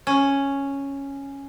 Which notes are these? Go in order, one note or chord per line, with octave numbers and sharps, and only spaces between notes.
C#4